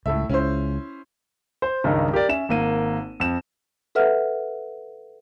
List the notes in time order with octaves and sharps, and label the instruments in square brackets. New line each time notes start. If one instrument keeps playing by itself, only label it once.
[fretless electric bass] C#2 [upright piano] A2 A4 E5
[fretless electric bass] C#2 C#3 [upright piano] C#4 E4 C5
[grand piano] C5
C#2 G2 D#3 D#4
G4 A#4 D5
C#4 E5 E7
G#1 A#3 D#7
F2 E7
[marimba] A4 B4 E5 F#5 F6